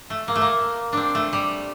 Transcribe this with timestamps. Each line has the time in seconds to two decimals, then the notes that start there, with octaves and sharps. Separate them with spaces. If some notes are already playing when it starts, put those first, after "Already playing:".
0.10 A3
0.28 A#3
0.35 A3
0.42 A#3
0.92 C4 D4
1.15 A3
1.33 G3